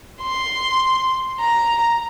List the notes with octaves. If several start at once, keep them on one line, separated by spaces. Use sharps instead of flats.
C6
A#5